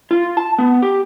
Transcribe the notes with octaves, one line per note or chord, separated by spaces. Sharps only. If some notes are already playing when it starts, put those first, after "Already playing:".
F4
A5
B3
G4